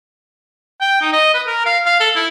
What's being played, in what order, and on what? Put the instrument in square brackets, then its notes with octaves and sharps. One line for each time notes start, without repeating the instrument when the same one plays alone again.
[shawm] G5
D#4
D#5
B4
A#4
F5
F5
A4
E4